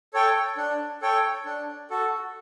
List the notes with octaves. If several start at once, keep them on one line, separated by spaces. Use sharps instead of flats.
A4 C#5 G5
D4
A4 C#5 G5
D4
F#4 A4